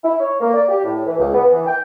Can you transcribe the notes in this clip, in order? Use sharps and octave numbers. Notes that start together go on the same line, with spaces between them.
E4
C#5
A#3
D5
G4
A2
E3
C#2
B3
E3
G5